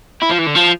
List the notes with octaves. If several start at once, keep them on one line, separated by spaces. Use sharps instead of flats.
E4
F3
E3
D3
F3